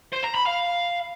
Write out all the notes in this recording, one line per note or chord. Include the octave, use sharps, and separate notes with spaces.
C5
A#5
B5
F5